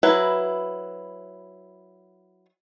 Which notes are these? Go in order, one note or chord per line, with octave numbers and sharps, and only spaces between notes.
F#3 E4 B4